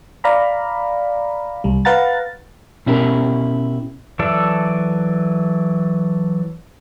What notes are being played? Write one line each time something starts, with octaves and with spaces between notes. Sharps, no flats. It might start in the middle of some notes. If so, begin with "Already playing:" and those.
D5 F5 A#5 B5
C2 G3
B4 F5 F#5 A#5 A6
B2 C#4 E4 G4 A#4
E3 F#3 A4 D5 E5